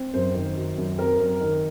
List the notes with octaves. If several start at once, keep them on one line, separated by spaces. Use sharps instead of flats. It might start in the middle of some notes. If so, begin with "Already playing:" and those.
Already playing: C4
F#2 C5
D#3
F#3
F#2
C4 A#4
F#2
D#3